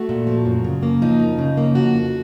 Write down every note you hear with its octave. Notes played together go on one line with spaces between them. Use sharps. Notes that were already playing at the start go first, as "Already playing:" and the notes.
Already playing: A3 F#4
A#2
F3
F#2
C#3
A#3
F3 D#4
F#2
C#3
A#3
F3 F#4
F2